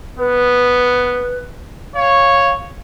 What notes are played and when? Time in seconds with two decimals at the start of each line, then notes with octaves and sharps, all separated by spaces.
0.19 B3 B4
1.95 C#5 F5